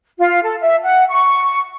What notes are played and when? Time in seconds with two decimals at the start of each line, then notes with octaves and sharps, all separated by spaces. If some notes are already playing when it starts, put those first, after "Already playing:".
0.19 F4
0.43 A4
0.62 E5
0.83 F#5
1.09 C#6